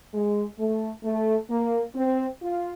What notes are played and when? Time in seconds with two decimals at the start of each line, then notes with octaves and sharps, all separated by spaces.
0.13 G#3
0.58 A3
1.03 A3
1.49 A#3
1.94 C4
2.41 F4